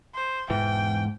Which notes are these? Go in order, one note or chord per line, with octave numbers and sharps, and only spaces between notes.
C5
E1 G#2 E3 G5